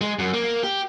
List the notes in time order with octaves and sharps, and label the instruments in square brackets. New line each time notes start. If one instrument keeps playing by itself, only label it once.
[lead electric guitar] G#3
F#2
A#3
G4